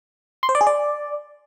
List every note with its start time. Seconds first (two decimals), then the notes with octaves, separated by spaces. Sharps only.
0.43 C6
0.49 C5
0.55 D5
0.61 G#4
0.67 D5